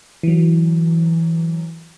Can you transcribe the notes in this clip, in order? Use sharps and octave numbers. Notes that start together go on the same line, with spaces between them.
E3 F#3